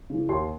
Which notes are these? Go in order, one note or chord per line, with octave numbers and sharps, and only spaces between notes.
C#3 E3
D#2 C6